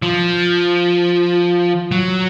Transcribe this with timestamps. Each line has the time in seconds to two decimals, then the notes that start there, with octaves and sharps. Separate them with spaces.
0.02 F3
1.91 F#3